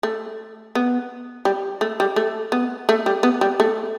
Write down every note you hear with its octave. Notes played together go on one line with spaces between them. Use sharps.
A3
B3
G3
A3
G3
A3
B3
A3
G3
B3
G3
A3